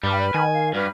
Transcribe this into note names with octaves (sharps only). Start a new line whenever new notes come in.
G2 G3 B4 B5 F6
D#3 G#5
F5
G2 F#4 B4 F6